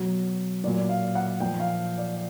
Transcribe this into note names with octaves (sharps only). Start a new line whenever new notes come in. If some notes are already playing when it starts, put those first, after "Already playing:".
Already playing: B2 F#3
A#2 F#3 D5
F5
F#5
A#2 F3 G5
F5
D5